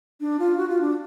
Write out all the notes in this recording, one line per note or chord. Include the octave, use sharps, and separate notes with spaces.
D4
F4
F#4
F4
D4